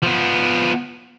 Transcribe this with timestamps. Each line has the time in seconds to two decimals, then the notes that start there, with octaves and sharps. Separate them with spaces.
0.03 F3 B3